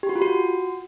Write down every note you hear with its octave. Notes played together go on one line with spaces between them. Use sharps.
G4
F#4
F4
F#4